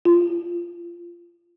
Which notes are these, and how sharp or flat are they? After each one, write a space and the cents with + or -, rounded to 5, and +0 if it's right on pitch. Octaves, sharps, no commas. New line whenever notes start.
F4 -20